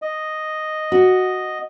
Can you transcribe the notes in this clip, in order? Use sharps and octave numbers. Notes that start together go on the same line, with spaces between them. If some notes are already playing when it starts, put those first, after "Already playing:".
D#5
F#4